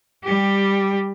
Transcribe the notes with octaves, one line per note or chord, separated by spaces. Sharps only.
G3 G4